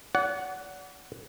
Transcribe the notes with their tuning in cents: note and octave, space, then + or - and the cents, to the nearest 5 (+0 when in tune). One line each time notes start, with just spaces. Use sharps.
D5 -40 F#5 +0